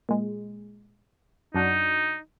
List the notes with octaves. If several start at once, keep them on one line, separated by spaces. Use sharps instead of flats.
A#2 G#3
F#2 D4 D#4 F#4